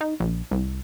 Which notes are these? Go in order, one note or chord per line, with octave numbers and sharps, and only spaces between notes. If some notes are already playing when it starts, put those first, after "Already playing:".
D#4
A#1
C2